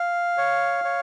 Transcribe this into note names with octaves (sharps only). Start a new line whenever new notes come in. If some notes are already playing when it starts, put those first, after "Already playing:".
Already playing: F5
C#5
C#5